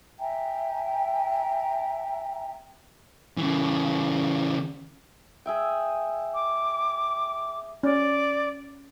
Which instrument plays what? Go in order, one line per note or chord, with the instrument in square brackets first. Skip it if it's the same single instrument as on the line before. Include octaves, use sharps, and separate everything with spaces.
[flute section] E5 G5 G#5 A#5
[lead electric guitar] C#3 E3
[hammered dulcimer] G#4 E5 G5
[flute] D6
[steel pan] C#4 [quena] D5